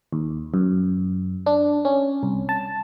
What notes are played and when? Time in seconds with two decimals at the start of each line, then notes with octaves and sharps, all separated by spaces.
0.13 D#2
0.54 F#2
1.46 D4
1.85 C#4
2.23 C2
2.49 A5